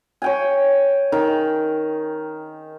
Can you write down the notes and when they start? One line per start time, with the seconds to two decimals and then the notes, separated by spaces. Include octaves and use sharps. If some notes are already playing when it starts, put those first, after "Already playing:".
0.22 C#5 G5 G#5
1.12 D#3